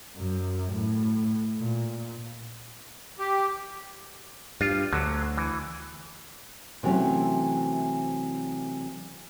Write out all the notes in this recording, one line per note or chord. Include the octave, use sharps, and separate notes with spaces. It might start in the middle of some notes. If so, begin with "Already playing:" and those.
F#2
A2
A#2
G4
G2 F4
D2 D3 F#3
E3
C3 E3 F#3 A3 C4 C#4